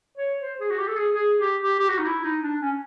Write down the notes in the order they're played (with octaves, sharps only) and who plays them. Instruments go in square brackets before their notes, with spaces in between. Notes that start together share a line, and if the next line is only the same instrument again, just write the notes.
[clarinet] C#5
C5
G#4
F#4
G4
A4
G#4
G#4
G4
G4
G4
F#4
D#4
E4
D#4
D4
C#4